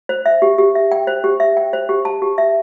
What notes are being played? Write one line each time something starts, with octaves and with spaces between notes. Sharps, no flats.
C5
E5
G4
G4
E5
G5
C5
G4
E5
G5
C5
G4
A5
G4
E5